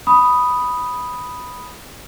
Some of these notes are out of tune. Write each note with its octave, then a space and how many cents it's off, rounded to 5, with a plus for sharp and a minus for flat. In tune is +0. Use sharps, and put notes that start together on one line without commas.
B5 +0 D#6 +0